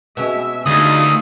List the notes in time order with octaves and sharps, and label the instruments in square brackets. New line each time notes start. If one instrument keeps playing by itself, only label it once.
[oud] B2 G#3 C#4 [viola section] E5
[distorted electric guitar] D2 [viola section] A3 D#4 F4 [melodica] D#6